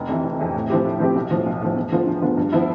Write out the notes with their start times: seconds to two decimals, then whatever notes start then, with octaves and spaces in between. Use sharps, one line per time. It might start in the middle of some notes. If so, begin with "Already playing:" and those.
Already playing: F1
0.09 F2 C3 E3
0.24 F1
0.39 F2 C3 E3
0.54 A2
0.70 F3 C4 E4 G4
0.85 A2
1.00 F3 C4 E4 G4
1.15 B1
1.31 A2 F3
1.46 B1
1.61 A2 F3
1.76 E2
1.92 D3 F3 B3 F4
2.07 E2
2.22 D3 F3 B3 F4
2.37 G2
2.52 F3 B3 E4